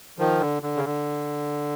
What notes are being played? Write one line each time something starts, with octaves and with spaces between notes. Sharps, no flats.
D#3 F3
D3
D3
C#3
D3